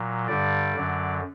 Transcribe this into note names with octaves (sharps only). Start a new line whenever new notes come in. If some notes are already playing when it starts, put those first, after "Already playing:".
Already playing: A#2 F#3
G2 D3 G3 D5
F#2 D3 F#3